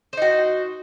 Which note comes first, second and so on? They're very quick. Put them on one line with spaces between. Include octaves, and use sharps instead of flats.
C5 D#4 F#4